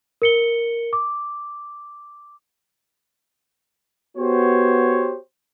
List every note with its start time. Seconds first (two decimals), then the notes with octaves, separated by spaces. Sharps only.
0.22 A#4 C#7 G7
0.93 D6
4.18 B3 F#4 G4 C5 C#5